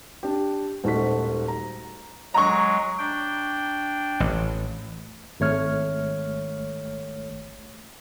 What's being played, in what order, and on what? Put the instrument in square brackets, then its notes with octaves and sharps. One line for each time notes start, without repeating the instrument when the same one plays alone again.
[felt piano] D4 G4
D#1 G#2 A3 F#4 C5 B6
A#5
[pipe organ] F#3 G#3 [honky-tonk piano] A#5 C#6
[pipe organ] D4 G5
[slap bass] A1
[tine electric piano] G#1 A3 C#5 F6